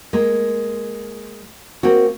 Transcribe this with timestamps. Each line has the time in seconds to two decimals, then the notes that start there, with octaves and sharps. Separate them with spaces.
0.13 G#3 A#3
1.83 A#3 C4 F#4